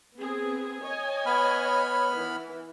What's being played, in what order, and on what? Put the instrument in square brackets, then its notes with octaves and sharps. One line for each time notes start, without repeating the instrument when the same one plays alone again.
[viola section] B3 C4 G#4
C#5 D#5 G#5
[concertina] B3 B5 F6
[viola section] E3